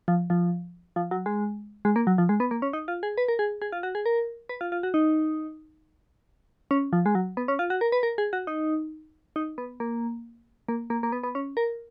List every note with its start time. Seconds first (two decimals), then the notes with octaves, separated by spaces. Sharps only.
0.08 F3
0.30 F3
0.96 F3
1.11 F#3
1.26 G#3
1.85 G#3
1.96 A#3
2.07 F#3
2.18 F3
2.29 G#3
2.40 B3
2.51 A#3
2.62 C#4
2.73 D#4
2.88 F4
3.03 G#4
3.18 B4
3.28 A#4
3.39 G#4
3.62 G#4
3.72 F4
3.83 F#4
3.95 G#4
4.06 A#4
4.49 B4
4.61 F4
4.72 F4
4.83 F#4
4.94 D#4
6.71 C#4
6.93 F3
7.06 G#3
7.15 F#3
7.37 B3
7.48 C#4
7.59 F4
7.70 F#4
7.81 A#4
7.92 B4
8.03 A#4
8.18 G#4
8.33 F#4
8.47 D#4
9.36 D#4
9.58 B3
9.80 A#3
10.69 A#3
10.90 A#3
11.03 A#3
11.12 B3
11.23 B3
11.35 C#4
11.57 A#4